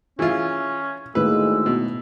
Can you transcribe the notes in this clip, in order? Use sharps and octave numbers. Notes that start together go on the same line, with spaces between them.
E3 C#4 F4 G#4 E5
D2 A2 D#3 G#3 A#3 B4 E6
B2